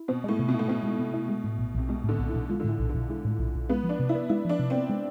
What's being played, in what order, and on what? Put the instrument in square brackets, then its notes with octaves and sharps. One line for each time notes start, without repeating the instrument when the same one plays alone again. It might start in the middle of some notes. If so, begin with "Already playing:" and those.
Already playing: [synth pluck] E4
[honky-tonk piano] B2 [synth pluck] C4
[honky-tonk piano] A2 [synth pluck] G#3
[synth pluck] C3
[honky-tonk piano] B2
[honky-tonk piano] A2 [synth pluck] E4
[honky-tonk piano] B2 [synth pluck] C4
[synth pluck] G#3
C3
E4
G#3
A2
B1
[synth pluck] B1 [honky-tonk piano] C3
[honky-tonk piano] B2 [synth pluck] G#3
[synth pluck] A2 [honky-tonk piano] D3
[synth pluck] B1
[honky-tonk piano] E3
[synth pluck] B1
[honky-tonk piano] F3 [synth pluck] G#3
[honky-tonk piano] D3
[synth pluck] A2 [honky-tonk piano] E3
[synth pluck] B1
[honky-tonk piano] D3
[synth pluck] B1
[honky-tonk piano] E3 [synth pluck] G#3
[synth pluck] A2
B1
B1
[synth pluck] G#3 [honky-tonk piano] B3
[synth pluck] F3
[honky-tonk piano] D4
[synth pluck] C3
[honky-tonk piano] E4
[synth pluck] B3
[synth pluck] G#3 [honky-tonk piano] E4
[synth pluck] F3 [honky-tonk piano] D4
[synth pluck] C3
[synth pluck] B3 [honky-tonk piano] C4
[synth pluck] G#3